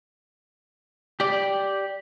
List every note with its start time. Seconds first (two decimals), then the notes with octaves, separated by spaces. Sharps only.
1.20 G4 D5